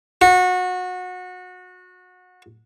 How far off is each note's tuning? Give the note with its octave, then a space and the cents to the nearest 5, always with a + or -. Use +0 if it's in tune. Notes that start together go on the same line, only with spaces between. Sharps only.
F#4 -25